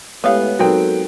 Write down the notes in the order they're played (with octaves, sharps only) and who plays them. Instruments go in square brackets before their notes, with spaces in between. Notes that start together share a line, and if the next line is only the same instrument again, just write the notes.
[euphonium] A2 [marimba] G#3 G4 C#5 [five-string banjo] B3 F5
[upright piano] F#3 G5 [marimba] C4 D#4 A#4 [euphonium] A4